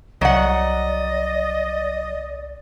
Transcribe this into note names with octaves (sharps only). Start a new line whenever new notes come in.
C2 F#3 D5 D#5 F#5